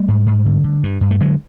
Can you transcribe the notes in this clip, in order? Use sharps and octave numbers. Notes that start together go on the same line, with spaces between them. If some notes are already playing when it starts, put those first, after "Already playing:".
Already playing: G3 A3
G#2
G#2
D3
D3
G2
G2
A3
D3 F#3 G#3